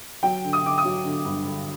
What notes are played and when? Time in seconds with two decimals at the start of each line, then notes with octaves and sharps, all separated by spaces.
0.23 F#3 G5
0.44 D3
0.53 D#6
0.63 D3 D6
0.78 D#6
0.85 F#3
1.04 D3
1.25 G2
1.45 D3